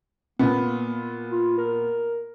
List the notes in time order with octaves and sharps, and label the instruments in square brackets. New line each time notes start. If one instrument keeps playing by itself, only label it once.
[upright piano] A#2 B3 [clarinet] A#3
[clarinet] F4
A#4